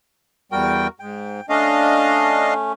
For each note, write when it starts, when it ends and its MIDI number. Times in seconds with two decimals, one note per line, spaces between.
0.52 0.87 40
0.52 0.87 55
0.52 0.89 66
0.52 0.89 70
0.52 0.87 79
1.00 1.41 44
1.00 1.46 79
1.49 2.73 57
1.49 2.73 61
1.49 2.54 62
1.49 2.54 75
1.49 2.54 77